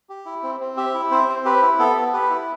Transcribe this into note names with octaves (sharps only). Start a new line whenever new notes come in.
G4
E4
C4
C4
G4 E5
E4
C4 C5
C4
G4 B4
E4
B3 A4
B3
G4 B4
E4